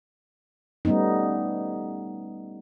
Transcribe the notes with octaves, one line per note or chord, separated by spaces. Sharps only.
G3 A3 B3 C#4 D#4